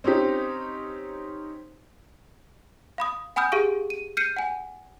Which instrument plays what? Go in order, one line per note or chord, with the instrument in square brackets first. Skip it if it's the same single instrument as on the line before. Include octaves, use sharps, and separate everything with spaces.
[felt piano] C4 C#4 D#4 G4
[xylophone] F5 B5 D#6
F#5 G#5 B5 D#6 F6 G6
G4 G#4 F5 C#6 D7
D#7
F6 G6 C7 C#7 D#7
F#5 G#5